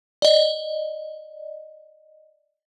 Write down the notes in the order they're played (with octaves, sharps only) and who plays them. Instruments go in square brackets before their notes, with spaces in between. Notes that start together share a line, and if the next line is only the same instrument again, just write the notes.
[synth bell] D5 D#5